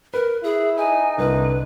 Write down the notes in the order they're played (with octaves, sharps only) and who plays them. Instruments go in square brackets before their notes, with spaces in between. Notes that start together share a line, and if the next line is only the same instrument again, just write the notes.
[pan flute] A#4 [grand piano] B4
[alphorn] E4 [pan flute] G#4
[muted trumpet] D#4 [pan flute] G#5
[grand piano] C2 [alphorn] D3 [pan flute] B4